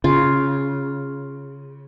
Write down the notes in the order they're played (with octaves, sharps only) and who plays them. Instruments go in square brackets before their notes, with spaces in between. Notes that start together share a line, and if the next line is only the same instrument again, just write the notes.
[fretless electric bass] C#3 [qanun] F4